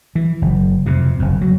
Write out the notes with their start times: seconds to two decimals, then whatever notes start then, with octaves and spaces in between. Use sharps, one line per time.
0.15 E3
0.42 F#1
0.86 F2 C3
1.19 F#1 F2
1.41 F#3